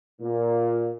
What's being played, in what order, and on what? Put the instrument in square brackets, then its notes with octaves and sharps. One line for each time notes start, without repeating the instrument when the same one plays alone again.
[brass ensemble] A#2